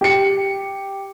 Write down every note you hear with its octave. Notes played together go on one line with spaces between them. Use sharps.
G4 C#7